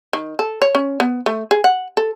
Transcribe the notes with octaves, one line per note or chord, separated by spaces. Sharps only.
D#3
A4
C#5
C#4
B3
A3
G#4
F#5
A4